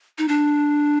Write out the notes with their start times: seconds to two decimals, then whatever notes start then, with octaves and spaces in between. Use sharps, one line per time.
0.18 D#4
0.28 D4